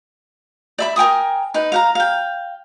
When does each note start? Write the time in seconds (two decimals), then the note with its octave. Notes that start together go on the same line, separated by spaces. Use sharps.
0.78 D5 E5 B5
0.96 A#4 G5 G#5 D#6
1.54 D#4 B4
1.72 F5 F#5 A#5
1.95 F5 G5